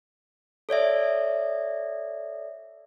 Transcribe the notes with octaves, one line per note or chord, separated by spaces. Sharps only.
A4 C#5 D5 E5